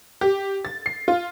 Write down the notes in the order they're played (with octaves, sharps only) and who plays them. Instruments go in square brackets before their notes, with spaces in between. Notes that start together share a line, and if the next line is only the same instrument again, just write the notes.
[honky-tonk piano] G4
A6
C7
F4